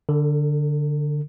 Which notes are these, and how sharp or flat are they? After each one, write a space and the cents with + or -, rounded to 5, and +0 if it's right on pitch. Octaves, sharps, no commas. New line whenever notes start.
D3 +0 A4 +45